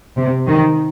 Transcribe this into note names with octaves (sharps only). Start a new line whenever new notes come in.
C3
D#3